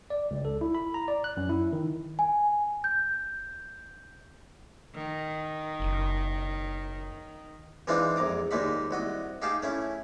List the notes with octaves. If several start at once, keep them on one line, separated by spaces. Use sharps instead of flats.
D5
C#2
A4
E4
B5
A#5
D5
F#6
F#2
E4
D#3
G#5
G6
D#3
F#1
E3 G#3 C4 D4 D#4 F4
A#1 F2 A#5 D6 D#6
D#2 A#2 G#3 A#3 D#4 B5
C2 F#4 D#5
D#4 G4 G#4 F5 G5 A5
A3 C#4 E4